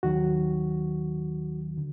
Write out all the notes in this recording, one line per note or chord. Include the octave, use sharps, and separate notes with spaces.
D#2 D#3 F#3 F#4
D3